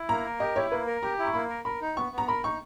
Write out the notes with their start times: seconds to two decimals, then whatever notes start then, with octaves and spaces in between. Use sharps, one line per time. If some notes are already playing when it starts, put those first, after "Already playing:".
Already playing: E4
0.09 A#3 A#5
0.25 A#4
0.40 G4 D#5
0.56 E4 C#5
0.71 A#3 B4
0.87 A#4
1.03 G4 A#5
1.19 E4
1.26 C#6
1.34 A#3 B5
1.49 A#4
1.65 A#4 B5
1.82 D#4
1.96 B3 C#6
2.12 B3
2.18 A#5
2.27 A#4 B5
2.44 D#4 C#6